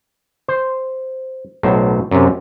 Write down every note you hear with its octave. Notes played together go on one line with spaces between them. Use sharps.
C5
B1 A2 F#3 C5
F#2 C3